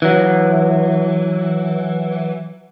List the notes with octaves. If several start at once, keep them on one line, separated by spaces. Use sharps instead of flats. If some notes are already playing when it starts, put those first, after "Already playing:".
E3 F#3